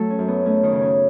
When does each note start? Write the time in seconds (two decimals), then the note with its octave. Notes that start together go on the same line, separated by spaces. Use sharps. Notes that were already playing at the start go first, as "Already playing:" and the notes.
Already playing: F#3 A3 A4
0.10 C#4
0.19 F#2
0.28 B3
0.45 A3 C#4
0.63 D#3 D#4
0.72 C#3
0.82 C#4